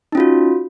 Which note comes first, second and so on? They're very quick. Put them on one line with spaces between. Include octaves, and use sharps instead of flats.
D#4 C#4 F4 F#4